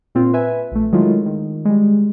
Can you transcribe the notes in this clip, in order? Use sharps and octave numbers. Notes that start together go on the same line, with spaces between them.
A#2 C4 F4
B4 E5 G#5
A#1 A3
D#3 F#3 G#3 A3 E4 F4
D#3
G3 G#3